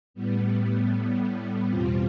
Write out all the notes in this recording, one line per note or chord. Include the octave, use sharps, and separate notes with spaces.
A2 G3 B3
E2 B2 G3 C4 F4